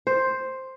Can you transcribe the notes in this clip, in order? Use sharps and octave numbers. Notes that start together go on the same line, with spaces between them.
C5